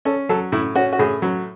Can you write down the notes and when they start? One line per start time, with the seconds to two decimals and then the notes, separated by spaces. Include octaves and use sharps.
0.05 C#4 A4
0.29 F#3 A4
0.52 A2 E4
0.75 C#4 F#4
0.93 F#4
0.99 A2 G#4
1.22 F#3